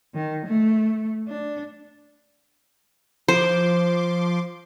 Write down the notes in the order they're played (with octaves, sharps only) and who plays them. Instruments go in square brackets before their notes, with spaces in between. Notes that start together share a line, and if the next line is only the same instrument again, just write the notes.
[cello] D#3
A3
D4
[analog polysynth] F3 C6 D6 [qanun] C5